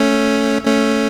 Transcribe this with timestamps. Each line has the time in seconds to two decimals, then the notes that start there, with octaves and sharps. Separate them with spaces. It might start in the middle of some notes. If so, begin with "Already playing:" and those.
Already playing: A3 C#4
0.65 A3 C#4